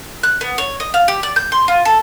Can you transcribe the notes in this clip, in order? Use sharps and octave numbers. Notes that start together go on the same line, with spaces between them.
F#6
B3
C#5
D#5
F5
G4
D5
G6
C6
F4
A4